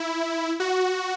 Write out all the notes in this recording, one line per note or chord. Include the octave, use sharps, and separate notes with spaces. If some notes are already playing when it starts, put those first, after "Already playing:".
Already playing: E4
F#4